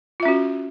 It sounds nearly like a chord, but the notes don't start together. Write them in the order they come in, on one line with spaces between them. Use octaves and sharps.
F4 E5 C#4 F#4